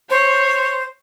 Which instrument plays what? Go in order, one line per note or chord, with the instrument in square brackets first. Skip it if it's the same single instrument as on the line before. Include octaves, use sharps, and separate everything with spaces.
[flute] C5 [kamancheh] C#5